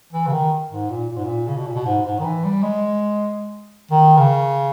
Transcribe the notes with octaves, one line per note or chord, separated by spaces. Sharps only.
E3
C#3
D#3
G#2
A#2
A#2
G#2
A#2
C#3
B2
A#2
B2
G#2
G#2
D#3
E3
G3
G#3
D#3
C#3